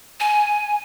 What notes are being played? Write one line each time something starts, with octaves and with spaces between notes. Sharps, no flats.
G#5